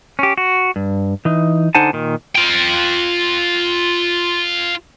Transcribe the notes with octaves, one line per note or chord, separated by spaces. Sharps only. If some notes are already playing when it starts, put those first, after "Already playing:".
C#4 G4
F#4
G2
E3 D#4
D3 D#4 C5 F#5 G#5 A5
A#2 D#3
F4 G5